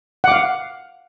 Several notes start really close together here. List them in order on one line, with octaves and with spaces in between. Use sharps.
F#5 D6 F5